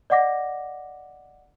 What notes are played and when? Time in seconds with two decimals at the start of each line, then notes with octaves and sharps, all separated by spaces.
0.10 D5 D#5 F#5 D6 A#6